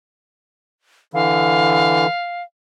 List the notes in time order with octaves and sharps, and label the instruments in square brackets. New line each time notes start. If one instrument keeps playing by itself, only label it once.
[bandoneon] D3 E3 [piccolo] F5